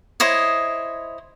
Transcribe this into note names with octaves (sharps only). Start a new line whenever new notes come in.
E4 C5 C#5 D#5